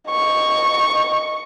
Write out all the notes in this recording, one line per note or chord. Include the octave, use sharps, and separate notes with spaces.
D#5 C#6